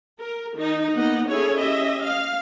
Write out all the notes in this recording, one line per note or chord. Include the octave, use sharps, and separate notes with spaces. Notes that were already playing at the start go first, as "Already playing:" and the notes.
A#4
D#3 D#4
A#3 B3 D#4 D#5 F#5
C#4 E4 G#4 A4 C#5
C#4 G4 D#5 E5
F5